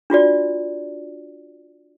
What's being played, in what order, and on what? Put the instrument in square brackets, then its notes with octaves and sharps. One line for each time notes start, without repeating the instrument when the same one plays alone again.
[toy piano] D4 F4 F#4 D5